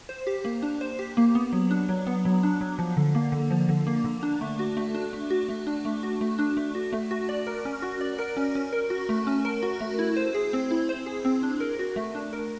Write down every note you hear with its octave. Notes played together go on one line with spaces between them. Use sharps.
C5
G4
A#3
D4
C5
G4
A#3
B3
F#3
D4
F#3
B3
F#3
D4
F#3
F3
D3
A#3
D3
F3
D3
A#3
D3
D4
A3
F#4
A3
D4
A3
F#4
A3
D4
A3
F#4
A3
D4
A3
F#4
A3
F#4
D5
A#4
C#4
F#4
D5
A#4
C#4
C#4
A#4
F#4
A3
C#4
A#4
F#4
A3
E4
C5
G#4
C4
E4
C5
G#4
C4
D4
A#4
F#4
A3
D4
A#4